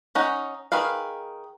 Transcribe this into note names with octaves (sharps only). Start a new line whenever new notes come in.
C#4 D#4 F#5
D#3 G#4 B4 F5